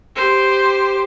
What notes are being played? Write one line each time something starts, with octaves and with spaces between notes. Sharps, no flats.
G4 C5